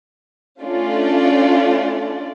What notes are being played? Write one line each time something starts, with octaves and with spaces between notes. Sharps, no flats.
A3 C#4 D4 F4 D5